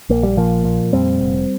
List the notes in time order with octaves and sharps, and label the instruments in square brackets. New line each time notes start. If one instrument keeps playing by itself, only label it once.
[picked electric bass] A#1 A#3
G3
A#2 F3 A#3
A#2
F2 G3 C4
F1